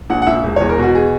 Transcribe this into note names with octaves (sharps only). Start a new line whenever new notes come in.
A#1 F#5
F#5
A#1 E5
E1
C#5
E2
A#4
B2 F#4
G#4